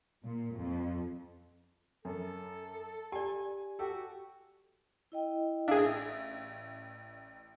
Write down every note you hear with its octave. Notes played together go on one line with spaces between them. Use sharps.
A#2
F2
F#2 A4
G4 D5 G#5
F#4 G4 A4
E4 D#5 G5
A1 D4 G#4 D5 E5 F5